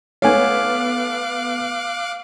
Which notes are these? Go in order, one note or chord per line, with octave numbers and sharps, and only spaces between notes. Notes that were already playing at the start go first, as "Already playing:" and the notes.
A3 B3 C#5 F5 G#5 D6 F#6